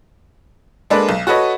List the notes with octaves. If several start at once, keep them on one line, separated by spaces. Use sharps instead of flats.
G#3 A#3 D4 A4 B4 D5
B1
F#4 A4 B4 C#5 D#5